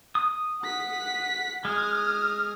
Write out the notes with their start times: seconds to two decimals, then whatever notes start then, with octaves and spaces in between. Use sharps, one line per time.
0.15 D#6
0.63 F#5 B6
1.65 G#3 D#6 F6